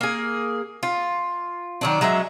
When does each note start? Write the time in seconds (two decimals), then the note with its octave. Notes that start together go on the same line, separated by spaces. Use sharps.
0.01 A#3 G#4
0.83 F4
1.81 D#3 F#3 D4
2.01 F#3 G#3 C#4 E5